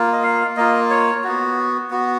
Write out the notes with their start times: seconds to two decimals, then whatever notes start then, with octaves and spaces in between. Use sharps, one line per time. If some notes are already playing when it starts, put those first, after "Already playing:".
Already playing: A#3 F4
0.13 D#5
0.23 F5
0.57 A#3 F4 D#5
0.90 C#5
1.24 B3 F#4
1.91 B3 F#4